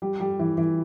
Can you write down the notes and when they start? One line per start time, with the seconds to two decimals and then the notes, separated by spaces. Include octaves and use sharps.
0.02 G3
0.20 G3
0.39 E3
0.58 E3